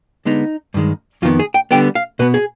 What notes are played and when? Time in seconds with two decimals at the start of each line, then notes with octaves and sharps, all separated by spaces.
0.25 D3 G#3 B3 D#4
0.74 G2 D#3 G#3
1.22 F2 D#3 B3 F4
1.39 G#4
1.54 G5
1.71 D3 G3 B3 G5
1.95 F5
2.19 B2 B3 B4
2.34 G#4